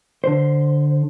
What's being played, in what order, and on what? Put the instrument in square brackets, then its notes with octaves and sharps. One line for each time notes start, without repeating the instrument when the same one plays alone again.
[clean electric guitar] D3 C5